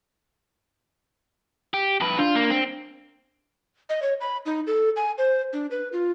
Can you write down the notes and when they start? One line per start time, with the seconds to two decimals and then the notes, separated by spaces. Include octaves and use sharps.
1.74 G4
2.01 F2 B4
2.19 D4 F4
2.35 A#3
2.50 C4
3.89 D#5
4.02 C#5
4.21 B5
4.46 D#4
4.67 A4
4.96 G#5
5.18 C5
5.53 D4
5.71 B4
5.93 F4